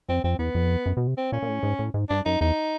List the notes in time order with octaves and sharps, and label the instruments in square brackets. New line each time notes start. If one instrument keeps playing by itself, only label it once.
[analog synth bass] F2 [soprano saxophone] C4
[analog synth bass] F2 [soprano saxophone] C4
[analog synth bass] E2 [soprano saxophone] B3
[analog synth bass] F2
F#2
B2
C3
[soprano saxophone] C4
[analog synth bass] A#2 [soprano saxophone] C#4
[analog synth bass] A#2
A2
G#2
A2
G#2
[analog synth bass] G2 [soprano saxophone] D4
[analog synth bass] F#2 [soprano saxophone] D#4
[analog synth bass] E2 [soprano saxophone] D#4